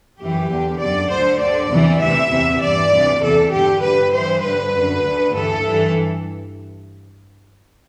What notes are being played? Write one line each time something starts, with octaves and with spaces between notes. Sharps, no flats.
F#2 E3 G4
E2 D3
F#2 D3 D5
D2 D3 C5
G2 D3 D5
E2 C3 E3
D2 C3 E3 E5
E2 C3 E3
G2 E3 D5
D2 C3 E3
E2 C3 E3 A4
G2 D3 G4
G2 D3 B4
G2 E3 C5
G2 D3 B4
F#2 D3
D2 D3
G2 E3 A4
G2 E3